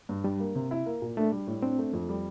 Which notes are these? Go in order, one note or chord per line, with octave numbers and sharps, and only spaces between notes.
G2
G3 D4
A#3
C3
E4
A#3
A#2
A3 D4
G3
A2
C4 D4
A3
F2
G3